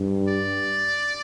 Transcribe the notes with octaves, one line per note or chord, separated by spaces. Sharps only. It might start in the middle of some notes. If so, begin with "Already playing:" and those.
Already playing: G2
D5